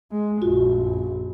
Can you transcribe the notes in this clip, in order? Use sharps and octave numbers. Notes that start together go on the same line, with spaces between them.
G#3
A#1 F#2 F4 F#4